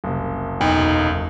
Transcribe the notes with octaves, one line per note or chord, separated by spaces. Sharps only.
F#1 C2
B1 E2 D#4